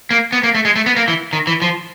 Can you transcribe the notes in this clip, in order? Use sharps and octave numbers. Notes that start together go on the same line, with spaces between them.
A#3
B3
A#3
A3
G#3
A3
B3
A#3
E3
D#3
E3
F3